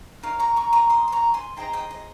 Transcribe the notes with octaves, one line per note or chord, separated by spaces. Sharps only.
D#4 A#4 C#5 F5
A#5 C#6
A#5 C#6
A#5 C#6
C6 D#6
C6
A#5 C#6
G#5 C6
D#4 G#4 C5 D#5 G5 A#5
D#5 G5
D#5